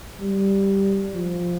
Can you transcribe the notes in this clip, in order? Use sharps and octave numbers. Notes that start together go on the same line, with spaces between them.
G3
F3